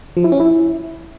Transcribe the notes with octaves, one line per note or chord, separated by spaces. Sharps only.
F3
E4
C#4
E4